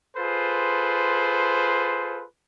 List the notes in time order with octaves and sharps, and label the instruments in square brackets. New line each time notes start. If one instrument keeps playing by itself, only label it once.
[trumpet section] F4 G#4 A4 B4 C5